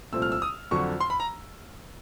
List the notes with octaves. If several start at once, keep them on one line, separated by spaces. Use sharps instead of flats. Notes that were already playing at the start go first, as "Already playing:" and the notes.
C2 A#2 F3 A3 C4 E6
F6
E6
D#6
F2 D3 F#3 C#6
C6
B5
A#5